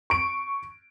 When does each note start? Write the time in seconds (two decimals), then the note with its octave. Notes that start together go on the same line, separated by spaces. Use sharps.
0.10 C#6 D7